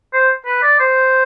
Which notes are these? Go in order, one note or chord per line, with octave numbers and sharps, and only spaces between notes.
C5
B4
D5
C5